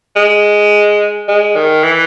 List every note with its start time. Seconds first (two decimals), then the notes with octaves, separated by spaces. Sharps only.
0.16 G#3
1.28 G#3
1.56 D#3
1.83 E3